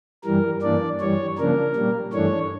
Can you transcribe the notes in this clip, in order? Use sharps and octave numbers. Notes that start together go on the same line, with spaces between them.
G2 E3 G3 A#4
G2 E3 A#3 D4 D5
G2 E3 G3 C#5
C#3 F3 A#3 D4 A#4
A#2 G3 A#3
G2 E3 A3 D4 C#5